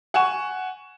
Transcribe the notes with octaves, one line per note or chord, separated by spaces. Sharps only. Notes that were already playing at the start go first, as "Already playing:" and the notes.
F#5 G#5 C#6 E7